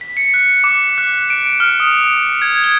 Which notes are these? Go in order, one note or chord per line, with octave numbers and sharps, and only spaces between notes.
B6
C#7
F#6
D6
F#6
D7
F6
D#6
G#6
G7